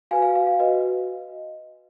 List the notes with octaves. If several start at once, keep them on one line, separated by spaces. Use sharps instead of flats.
F#4 B4 F5 G#5
F5
F5
F5
F#4 B4 D#5